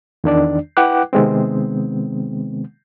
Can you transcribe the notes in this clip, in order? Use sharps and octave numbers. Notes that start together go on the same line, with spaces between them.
E2 D#3 D4 D5
E4 B4 F#5 G5 D6 F#6
C3 D#3 G#3 B3 C4